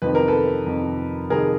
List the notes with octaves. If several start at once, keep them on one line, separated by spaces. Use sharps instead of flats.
F2 C3 D#3 B4
A#4
A4 B4
F2 C3 D#3
F2 C3 D#3 G#4 A#4